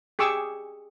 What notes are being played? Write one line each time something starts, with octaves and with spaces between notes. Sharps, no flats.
G4 G#4 C#6 D6 E6